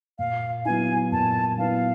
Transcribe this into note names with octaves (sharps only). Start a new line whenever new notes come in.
A#2 F5
F#3 B3 E4 G#5
A#2 A5
F#3 B3 E4 F5